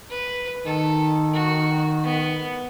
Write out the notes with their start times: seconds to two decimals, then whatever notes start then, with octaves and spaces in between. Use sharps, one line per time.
0.10 B4
0.66 D#3 A4
1.34 F#4
2.04 B3